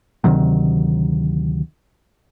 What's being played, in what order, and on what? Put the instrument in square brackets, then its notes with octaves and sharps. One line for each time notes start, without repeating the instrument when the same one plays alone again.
[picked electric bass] D2 C3 D#3 F#3